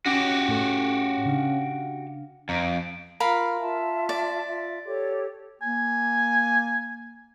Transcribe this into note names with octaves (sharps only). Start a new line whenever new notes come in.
C#4 F#4 G4 D#5 F#5 D6
A2 A4
C#3 D4 F5
F2 A#5 D7
F4 A#4 F5 B5
F4 E5 A5
D5
F4 E5
G4 A4 C#5
A#3 G#5